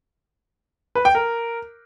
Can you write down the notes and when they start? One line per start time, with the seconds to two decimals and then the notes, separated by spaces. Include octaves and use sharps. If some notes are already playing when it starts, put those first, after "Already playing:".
0.95 B4
1.05 G5
1.15 A#4